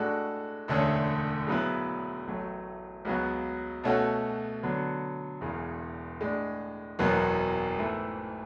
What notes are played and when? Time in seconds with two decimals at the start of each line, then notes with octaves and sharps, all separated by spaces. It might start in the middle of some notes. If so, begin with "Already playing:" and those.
Already playing: A2 G#3 D4 F#4 A4
0.68 E1 D2 D3 A3 C#4
1.47 C#3 F#3 B3 E4 B4
2.26 A1 A2 F#3 A3
3.05 C#2 C#3 F#3 B3 F#4
3.84 B2 A3 C#4 F#4 A4
4.63 D3 F#3 B3
5.41 E1 E2 C#3 E3
6.21 A2 G#3 D4
6.99 F#1 E2 B2 F#3 B3
7.77 G#2 E3 A3 E4